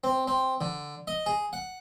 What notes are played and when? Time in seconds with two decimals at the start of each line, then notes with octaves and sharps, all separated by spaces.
0.04 C4
0.27 C4
0.61 D3
1.07 D#5
1.26 G#4
1.53 F#5